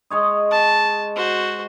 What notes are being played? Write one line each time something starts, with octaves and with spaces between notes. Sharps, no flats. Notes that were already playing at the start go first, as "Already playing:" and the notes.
G#3 C#5 D#5
A5
F#4 C5